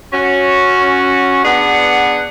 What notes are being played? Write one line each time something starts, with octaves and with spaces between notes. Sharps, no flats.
C#4 F#4
B3 D4 G#4 B4 F#5